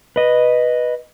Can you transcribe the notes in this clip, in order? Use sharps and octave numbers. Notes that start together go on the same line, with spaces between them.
B4 D#5